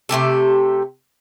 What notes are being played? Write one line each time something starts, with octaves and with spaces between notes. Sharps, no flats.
C3 A3 G4 A4